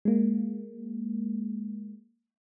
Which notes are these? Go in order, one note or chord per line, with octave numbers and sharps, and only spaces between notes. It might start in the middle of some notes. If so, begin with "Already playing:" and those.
G#3 A#3